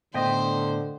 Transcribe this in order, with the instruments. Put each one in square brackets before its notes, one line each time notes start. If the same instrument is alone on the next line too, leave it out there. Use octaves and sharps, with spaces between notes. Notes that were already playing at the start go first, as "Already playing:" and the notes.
[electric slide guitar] A2 B3 E5 [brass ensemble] D3 [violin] C5 [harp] D#5 G5